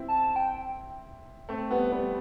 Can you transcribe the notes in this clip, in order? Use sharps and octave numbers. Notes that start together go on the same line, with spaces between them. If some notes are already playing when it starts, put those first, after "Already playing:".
Already playing: C4 E4
A5
G5
A3 C4
G3 B3
G3 B3